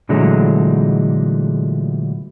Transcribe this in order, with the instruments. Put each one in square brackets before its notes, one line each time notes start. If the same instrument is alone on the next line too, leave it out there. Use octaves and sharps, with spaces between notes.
[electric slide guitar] A#2 D3 E3 F#3 G#3 A3